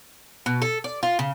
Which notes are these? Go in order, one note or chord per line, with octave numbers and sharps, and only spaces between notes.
B2
A4
D5
F4
C#3